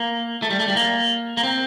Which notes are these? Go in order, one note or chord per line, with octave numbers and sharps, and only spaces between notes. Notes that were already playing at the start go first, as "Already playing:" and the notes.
Already playing: A#3
A3
G3
A3
G3
A#3
A#3
C4